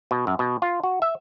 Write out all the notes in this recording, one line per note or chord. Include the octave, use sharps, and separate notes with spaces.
B2
F#2
B2
F4
F#4
E5